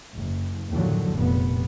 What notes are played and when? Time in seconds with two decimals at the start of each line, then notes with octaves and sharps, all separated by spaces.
0.15 F#1
0.71 D#2 A2 D3 F3 F#3
1.16 F1 A#2 B3